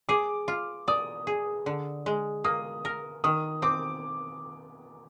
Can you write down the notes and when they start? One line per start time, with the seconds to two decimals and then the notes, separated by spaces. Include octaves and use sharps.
0.09 G#4 D6
0.48 F4
0.88 D5 D#6
1.27 G#4
1.66 D3
2.06 G#3
2.44 A#3 D#6
2.85 A#4
3.24 D#3 D#6
3.62 C4 D6